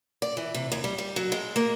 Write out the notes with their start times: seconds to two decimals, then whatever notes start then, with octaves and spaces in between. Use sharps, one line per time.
0.22 D5
0.37 E3
0.54 C3
0.72 D#2
0.84 G3
0.98 G3
1.16 F#3
1.32 G#3
1.56 A#3